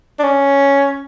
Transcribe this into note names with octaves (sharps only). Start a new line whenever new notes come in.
D4
C#4